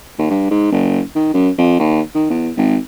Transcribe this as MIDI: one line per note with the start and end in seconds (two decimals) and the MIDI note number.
0.18 0.28 39
0.30 0.47 43
0.50 0.68 44
0.72 1.01 30
1.15 1.33 51
1.34 1.50 42
1.58 1.76 41
1.79 2.01 39
2.14 2.25 51
2.30 2.50 40
2.57 2.77 32